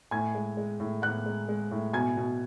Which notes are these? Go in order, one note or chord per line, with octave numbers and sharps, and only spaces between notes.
A2 G#5 G#6
G#3
G#3
A2
A2 F#5 F#6
G#3
G#3
A2
B2 G#5 G#6
B2